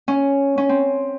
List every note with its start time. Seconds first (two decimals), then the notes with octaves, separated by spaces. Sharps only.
0.08 C#4
0.58 C#4
0.69 C4